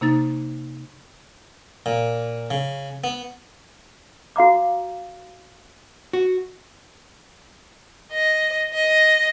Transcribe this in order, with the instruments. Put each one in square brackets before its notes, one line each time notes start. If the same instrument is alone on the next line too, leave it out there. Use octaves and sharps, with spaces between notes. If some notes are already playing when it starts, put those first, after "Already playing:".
[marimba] C3 A#3 D#4 A6
[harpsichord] A#2
C#3
B3
[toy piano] F#4 F5 A#5 D6
[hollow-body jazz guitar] F#4
[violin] D#5
D#5